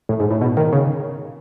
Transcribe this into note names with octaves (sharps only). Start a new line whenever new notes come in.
A2
G#2
A2
B2
D#3
C#3